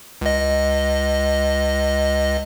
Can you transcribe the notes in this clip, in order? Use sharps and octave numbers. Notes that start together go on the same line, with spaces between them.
C#2 D#5